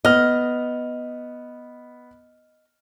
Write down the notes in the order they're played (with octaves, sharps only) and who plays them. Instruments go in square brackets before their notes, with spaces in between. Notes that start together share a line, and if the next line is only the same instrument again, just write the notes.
[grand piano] B3 F6 [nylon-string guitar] D#5